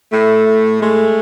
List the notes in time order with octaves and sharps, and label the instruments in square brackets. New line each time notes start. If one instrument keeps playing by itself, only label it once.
[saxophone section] A2 A3
A2
G#3 A3